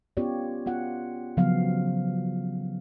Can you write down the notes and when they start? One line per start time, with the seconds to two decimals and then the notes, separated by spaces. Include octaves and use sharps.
0.17 B3 C#4 F4 G4 C#5 D5
0.66 B3 F4 F#5
1.37 C#3 F3 F#3 B3 F5